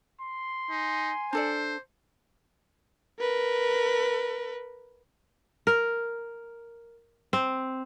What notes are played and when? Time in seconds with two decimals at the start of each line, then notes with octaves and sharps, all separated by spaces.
0.21 C6
0.70 D#4 G#5
1.33 D4 A4 C5 D5
3.20 A#4 B4
5.67 A#4
7.33 C4